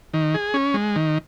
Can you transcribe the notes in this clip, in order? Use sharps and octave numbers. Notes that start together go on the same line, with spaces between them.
D#3
G#4
C#4
G#3
D#3